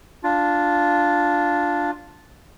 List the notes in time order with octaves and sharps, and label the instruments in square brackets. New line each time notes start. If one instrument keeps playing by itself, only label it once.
[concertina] D4 F4